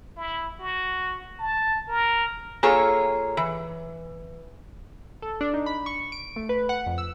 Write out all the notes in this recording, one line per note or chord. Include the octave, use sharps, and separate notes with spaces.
E4
F#4
A5
A#4
A#3 F4 G#4 A4 C#5
E3
A4
D4
D#4
B5
C#6
D7
A3
B4
F#5
F2
E6